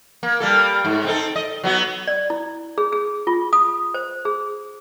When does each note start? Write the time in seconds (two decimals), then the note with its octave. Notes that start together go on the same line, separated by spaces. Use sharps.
0.23 A#3
0.40 G3 A#3 A4
0.85 G#2
1.04 C4 D#4 A4
1.36 D#5
1.64 F#3 B3 F#4
2.07 D5
2.30 E4
2.78 G#4
2.93 G#4
3.27 F4
3.53 D#6
3.94 C5
4.25 G#4